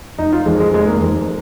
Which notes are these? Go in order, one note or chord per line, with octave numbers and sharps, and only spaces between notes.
F1 D#4
F4
F2 D#3 G#3
G#3
F1 G#3
A#3
F2 D#3